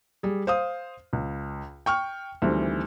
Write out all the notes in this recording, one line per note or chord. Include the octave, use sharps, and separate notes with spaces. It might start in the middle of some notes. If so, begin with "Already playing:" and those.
G3 G#4
C5 F5 D#6
C#2
G5 C#6 F6
D2 D#3 E3 G3 C4